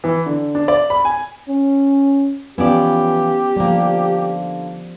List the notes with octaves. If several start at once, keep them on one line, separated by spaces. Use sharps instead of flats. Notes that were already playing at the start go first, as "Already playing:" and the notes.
E3
D3
D4
D5
B5
G#5
C#4
E3 F3 B3 C#4 F4 G4 D5
D3 F3 G3 A#3